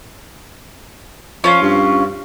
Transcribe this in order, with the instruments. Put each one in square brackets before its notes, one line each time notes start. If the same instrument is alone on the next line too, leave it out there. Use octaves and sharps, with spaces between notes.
[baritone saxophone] F3 [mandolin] C#4 F4
[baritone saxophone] G2